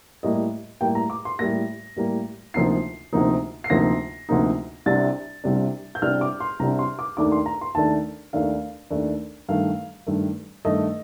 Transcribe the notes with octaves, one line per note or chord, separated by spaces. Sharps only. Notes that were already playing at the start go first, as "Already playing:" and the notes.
A2 G3 A#3 D#5
A2 G3 A#3 G5
A#5
D6
C6
A2 G3 A#3 A#6
A2 G3 A#3
D2 C3 F3 A#3 D#4 C7
D2 C3 F3 A#3 D#4
C7
D2 C3 F3 A#3 D#4 A#6
D2 C3 F3 A#3 D#4
C2 C3 G3 D4 A6
C2 C3 G3 D4
G6
C2 C3 G3 D4 F6
D6
C6
C2 C3 G3 D4 A#5
C6
D6
D#2 D#3 A3 D4 D6
C6
A#5
C6
D#2 D#3 A3 D4 A5
D#2 D#3 A3 D4 F5
D#2 D#3 A3 D4
G2 D#3 A3 F5
G2 D#3 A3
G2 D#3 A3 D#5